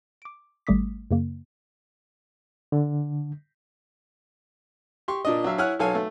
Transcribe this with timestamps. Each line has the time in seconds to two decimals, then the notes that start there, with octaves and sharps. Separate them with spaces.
0.22 D6 D7
0.67 G#1 G3 A3 D6 D#6 B6
1.11 F#2 C#3 A#3
2.72 D3
5.08 G4 C6 C#6
5.25 A#2 D4 D#5
5.44 F#3 D4 E5 F5
5.58 E4 C#5 F#5 G#5 F6 F#6
5.80 B1 A4 C#5 F5 G#5
5.95 A3